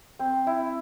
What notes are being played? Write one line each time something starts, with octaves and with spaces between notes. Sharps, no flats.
C4
E4